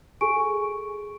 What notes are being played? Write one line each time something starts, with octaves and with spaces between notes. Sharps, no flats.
F#4 G#4 A4 G#5 C#6 D7